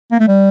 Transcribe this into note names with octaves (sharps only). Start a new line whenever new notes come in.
A#3
A3
G3